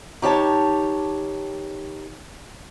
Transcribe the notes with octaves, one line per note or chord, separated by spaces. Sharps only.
D#3 G4 C#5 A5